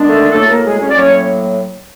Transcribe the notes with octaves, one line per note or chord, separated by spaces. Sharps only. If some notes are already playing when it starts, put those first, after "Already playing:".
Already playing: D#3 G#3 B3 D4
A3 A4
A2 F#3 A3 A#3 A4
A#3 A#4
G#3 G#4
C#4 C#5
D5
A2 F#3 A#3 C#4 C#5